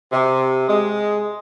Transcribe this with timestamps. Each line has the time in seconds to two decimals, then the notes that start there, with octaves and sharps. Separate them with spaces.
0.12 C3
0.68 G#3